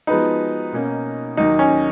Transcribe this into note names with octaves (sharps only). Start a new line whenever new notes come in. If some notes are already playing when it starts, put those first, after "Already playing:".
F3 G#3 B3 D#4 F#4 B4
B2 A#3 C#4
D#2 D#3 F#3 D#4
C#4